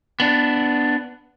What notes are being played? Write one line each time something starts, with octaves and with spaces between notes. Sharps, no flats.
B3 D4